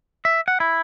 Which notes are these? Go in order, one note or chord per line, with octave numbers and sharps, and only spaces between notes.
E5
F#5
E4